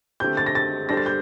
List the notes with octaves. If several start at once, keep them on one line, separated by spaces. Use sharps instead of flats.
D3 A3 C4 G4 G6
A6
A#6
A6
G3 D4 A4 C5 A#6
A6
G6